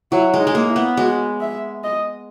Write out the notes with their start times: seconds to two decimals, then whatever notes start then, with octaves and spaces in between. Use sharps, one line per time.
0.11 F#3 E4
0.34 G#3
0.40 D#4
0.47 G#3
0.55 A#3
0.69 E4
0.76 B3
0.97 G#3 F#4
1.41 E5
1.84 D#5